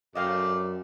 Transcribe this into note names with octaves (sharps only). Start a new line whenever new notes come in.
F#2 A3 D5 D#5 F5 G5